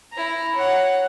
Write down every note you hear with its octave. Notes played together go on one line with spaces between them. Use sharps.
E4 A#5
C#5 F#5